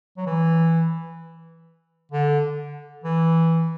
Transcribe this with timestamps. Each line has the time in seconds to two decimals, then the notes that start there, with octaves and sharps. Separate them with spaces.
0.17 F#3
0.26 E3
2.12 D3
3.04 E3